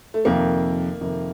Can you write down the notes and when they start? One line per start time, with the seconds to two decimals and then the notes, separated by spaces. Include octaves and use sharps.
0.14 A3
0.25 F2 C3 D#3 A#3
1.01 F2 C3 D#3